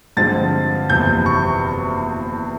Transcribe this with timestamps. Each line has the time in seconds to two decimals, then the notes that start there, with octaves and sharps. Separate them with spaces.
0.17 G2 D3 F3 G#3 C4 A6
0.89 F#1 E2 C3 F3 G6
1.26 C#6